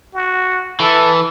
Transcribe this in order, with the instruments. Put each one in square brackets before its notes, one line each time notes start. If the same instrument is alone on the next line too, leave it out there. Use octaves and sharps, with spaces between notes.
[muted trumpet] F#4
[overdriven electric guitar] E3 [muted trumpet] A4